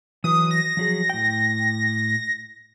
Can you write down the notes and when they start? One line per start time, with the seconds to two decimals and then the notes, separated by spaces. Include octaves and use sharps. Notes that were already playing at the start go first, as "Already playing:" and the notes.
0.24 E3 F#3 B4 D#6
0.51 A#6
0.77 F3 F#3 G#4
1.09 A2 G5